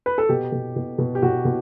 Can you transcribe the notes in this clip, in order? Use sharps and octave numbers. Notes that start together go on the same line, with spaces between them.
B4
A4
B2 G4
B2
B2
B2
G4
B2 F#4
B2